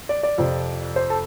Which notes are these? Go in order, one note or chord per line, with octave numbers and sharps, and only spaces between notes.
D5
D5
F2 C3 F3
C5
A4